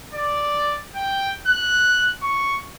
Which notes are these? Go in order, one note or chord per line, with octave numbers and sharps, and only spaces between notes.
D5
G5
F#6
C#6